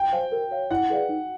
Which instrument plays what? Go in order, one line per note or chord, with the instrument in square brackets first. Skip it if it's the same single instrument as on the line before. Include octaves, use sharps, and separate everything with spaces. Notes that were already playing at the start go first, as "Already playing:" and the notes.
Already playing: [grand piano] G5
[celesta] C5 F5 G#5
A#4
C#5 F5
[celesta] E4 [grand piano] F#5
[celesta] G#4 B4 D5 F5
D#4